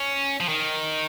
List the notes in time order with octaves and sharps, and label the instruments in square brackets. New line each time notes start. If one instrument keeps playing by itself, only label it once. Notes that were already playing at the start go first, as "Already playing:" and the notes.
Already playing: [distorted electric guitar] C#4
F3
D#3